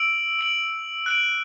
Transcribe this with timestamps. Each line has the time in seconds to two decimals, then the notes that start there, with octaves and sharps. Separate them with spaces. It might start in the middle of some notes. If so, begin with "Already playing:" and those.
Already playing: E6 D7 F#7
0.39 E6 D7 F#7
1.06 F#6 D7 F#7